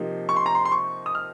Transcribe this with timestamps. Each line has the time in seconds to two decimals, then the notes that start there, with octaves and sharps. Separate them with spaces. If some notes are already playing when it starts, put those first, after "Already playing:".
Already playing: C3 F3 A#3 D#4
0.29 C#6
0.36 C6
0.46 A#5
0.55 C6
0.65 C6
0.72 C#6
1.06 D#6
1.15 F6